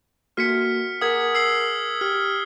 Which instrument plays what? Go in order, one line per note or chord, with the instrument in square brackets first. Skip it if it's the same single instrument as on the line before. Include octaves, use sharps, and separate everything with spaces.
[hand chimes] A#3 F#4 A4 [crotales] F6 B6 C#7
[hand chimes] G#4 A#4 F#5 [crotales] D#6 G#6
[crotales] E6 C7 F#7
[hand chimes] G4 [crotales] F6